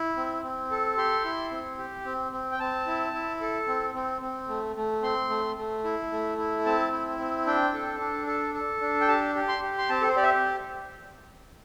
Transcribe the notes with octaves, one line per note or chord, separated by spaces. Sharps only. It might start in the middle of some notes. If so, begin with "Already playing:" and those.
Already playing: E4
C4
C4
A4
G4 C6
E4
C4
G4
C4
C4
G5
C4 A5
E4
E4
A4
C4
C4
C4
A3
A3
C4 C6
A3
A3
E4
A3
E4
C4 A5
E4
C4
D4 G5
A4
D4
A4
A4
D4
G5
G4 A5
G4
C6
G4
C6
C4 A5
A4
C5
G4 D5
E5